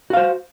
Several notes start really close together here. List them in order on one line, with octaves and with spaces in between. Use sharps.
F#4 F5 C5